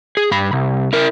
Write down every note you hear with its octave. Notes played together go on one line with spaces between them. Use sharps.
G#4
G2 B5
C2
E4 A#4